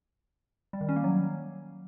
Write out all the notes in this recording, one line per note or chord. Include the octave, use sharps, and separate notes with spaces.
G3
D#3
C#4
A#3
F#3